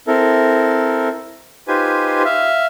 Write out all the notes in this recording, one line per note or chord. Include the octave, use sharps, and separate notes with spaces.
C4 E4 A4 A#4
D#4 F4 G4 B4 C5 G#5
E5 F5